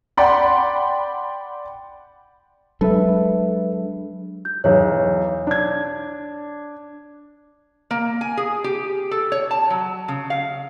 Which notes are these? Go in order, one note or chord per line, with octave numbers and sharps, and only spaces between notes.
D5 F#5 G5 B5 C6
F#3 G#3 D4 A4 B4 E5
G6
B1 E2 C#5
D4 G#6
A#3
G#5
G#4
G4
A4
C#5
A5
F#3
C#3
F5